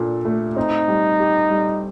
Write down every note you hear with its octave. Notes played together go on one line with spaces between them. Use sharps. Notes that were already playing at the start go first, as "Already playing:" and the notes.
Already playing: A#2 D4 A4
A3
C4 D#4
G3
G4
G3